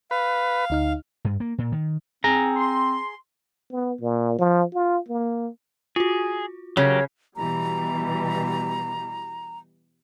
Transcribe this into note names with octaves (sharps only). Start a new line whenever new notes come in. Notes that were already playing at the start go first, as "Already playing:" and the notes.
B4 F5
D2 D#4 F6
G2
A#3
A#2
D#3
C4 G#4 A#5
C6
B3
A#2
F3
F4
A#3
F4 F#4 G#4
C#3 F#3 G4 A#4 C#5
B2 E3 G3 A#5